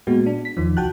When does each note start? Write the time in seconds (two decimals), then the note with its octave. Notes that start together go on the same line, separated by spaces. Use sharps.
0.07 A#2 G#3 B3 F#4
0.26 D4
0.45 B6
0.57 E2 D#3 F3
0.77 C2 F#4 G5 A5 F#6